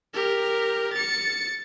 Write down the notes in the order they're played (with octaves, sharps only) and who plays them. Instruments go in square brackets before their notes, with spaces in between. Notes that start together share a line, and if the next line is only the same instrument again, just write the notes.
[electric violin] G4 A#4
A6 C#7